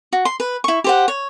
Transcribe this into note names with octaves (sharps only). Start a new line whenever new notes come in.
F#4
C6
B4
E4 C#6
G4 C5 F#5
C#5